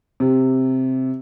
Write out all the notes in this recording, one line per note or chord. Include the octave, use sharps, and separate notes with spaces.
C3